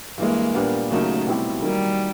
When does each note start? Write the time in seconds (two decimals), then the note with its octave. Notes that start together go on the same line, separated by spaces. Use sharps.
0.18 G2 E3 G#3 A#3
0.54 A#2 G3 B3 D4
0.90 D#2 C#3 F#3 A3 A#3 D#4
1.26 B2 G3 C4 E4 G4
1.62 D#3 F#3 G3 A#3